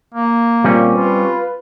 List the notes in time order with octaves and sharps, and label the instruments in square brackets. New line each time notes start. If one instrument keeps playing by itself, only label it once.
[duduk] A#3
[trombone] A#2 [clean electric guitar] G3 C4 C#4
[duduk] F4 [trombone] B4